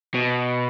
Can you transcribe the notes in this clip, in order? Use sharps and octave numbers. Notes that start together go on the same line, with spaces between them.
B2